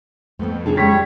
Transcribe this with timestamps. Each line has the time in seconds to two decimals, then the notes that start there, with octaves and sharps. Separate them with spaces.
0.39 F2 A3 B3 C4
0.66 F#1 C#3 A#3 G#4 A4
0.77 G3 G#3 G#4 C#5 B6